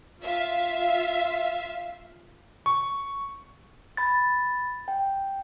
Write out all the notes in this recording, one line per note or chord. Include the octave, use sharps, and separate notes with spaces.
F4 E5 F5
C#6
B5 A6
G5